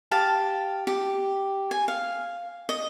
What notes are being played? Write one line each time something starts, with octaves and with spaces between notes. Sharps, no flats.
G4 F5 A5
G4
G#5
F5
D#5